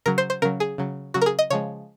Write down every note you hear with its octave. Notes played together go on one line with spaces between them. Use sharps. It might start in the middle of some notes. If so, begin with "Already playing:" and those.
C#3 F#3 A#4
C5
C5
C#3 F#3 A#4
G#4
C#3 F#3
C#3 F#3 F#4
A#4
G#4
D#5
C#3 F3 G#3 C#5